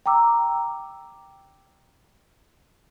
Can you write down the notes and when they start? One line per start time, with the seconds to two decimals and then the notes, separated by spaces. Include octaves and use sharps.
0.06 G5 A#5 D6 E6